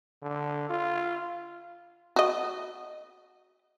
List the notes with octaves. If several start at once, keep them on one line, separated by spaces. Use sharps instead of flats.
D3
F4
F#4 D#5